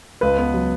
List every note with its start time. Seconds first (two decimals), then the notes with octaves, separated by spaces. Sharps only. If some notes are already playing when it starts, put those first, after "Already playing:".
0.21 C#2 B4
0.38 B3
0.54 F#3